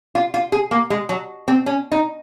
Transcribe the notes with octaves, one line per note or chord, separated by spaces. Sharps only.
F4
F4
G#4
A#3
G#3
F#3
C4
C#4
D#4